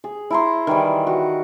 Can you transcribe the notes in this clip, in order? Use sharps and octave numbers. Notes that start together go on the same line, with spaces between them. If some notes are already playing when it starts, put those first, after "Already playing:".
G#4
E4 A#5 C6
D#3 E3 G3
F#4